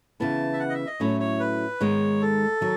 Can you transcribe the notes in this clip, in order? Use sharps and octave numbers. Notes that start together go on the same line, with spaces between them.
C#3 E3 B3 E4 A5
E5
F#5
D#5
E5
D#5
A2 F#3 A3 C#4 E4 C#5
C#5
B4
G#2 D#3 G#3 B3 C#5
A4
D#3 F#3